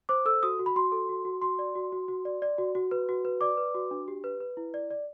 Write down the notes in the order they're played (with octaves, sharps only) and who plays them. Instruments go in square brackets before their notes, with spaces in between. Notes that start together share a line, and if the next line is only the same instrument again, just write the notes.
[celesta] C5 D6
A4 E6
F#4 D#6
F#4
B5
F#4 C6
A4
F#4
F#4
F#4 C6
D5
F#4
F#4
F#4
D5
D5
F#4
F#4
B4
F#4
B4
D5 D6
B4
F#4
D4
G4
B4
B4
E4
D5
D5